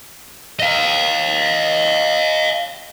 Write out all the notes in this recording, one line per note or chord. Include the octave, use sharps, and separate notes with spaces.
D#5 F5